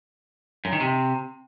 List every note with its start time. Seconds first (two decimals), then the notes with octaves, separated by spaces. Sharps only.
0.65 F#2
0.73 D#3
0.80 C3